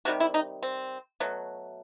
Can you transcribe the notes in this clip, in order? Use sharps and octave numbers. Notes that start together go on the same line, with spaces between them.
C3 D#3 G3 F#4
E4
D#4
C4
B2 F#3 A3